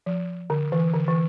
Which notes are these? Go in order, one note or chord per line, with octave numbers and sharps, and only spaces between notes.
F3
D3
E3
D3
E3